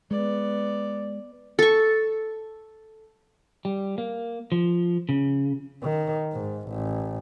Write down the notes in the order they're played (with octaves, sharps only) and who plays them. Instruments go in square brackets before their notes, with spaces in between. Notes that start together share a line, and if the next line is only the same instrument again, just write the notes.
[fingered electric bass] G#3 [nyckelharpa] B3 D5
[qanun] A4 C#6
[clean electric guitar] G3
A#3
F3
C#3
[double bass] D#3
G#2
A1